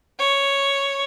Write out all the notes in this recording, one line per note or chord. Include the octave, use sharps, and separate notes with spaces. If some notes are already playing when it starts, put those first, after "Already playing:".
C#5